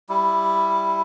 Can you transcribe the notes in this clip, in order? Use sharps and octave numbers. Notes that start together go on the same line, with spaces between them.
G3 E4